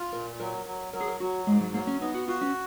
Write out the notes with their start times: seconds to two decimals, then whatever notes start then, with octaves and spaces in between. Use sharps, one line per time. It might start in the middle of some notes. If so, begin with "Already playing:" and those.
Already playing: F4
0.13 A#2 A#4
0.40 F#3 A#4
0.66 F#3
0.93 F#3 A#4
1.01 G#4
1.08 A#4
1.20 F#3 F#4
1.47 G#2 G#3
1.61 F#3
1.74 F#3 A#3
1.87 C#4
2.01 B3 D#4
2.15 F#4
2.28 F4 F#4
2.41 C#4